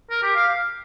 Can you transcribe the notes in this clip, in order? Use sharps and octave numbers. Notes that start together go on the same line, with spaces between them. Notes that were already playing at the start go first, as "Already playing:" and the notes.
A#4
G4
F5